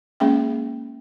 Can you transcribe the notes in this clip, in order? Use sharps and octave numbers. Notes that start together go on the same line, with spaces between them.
G#3 A#3 C#4 G#4 E5 G5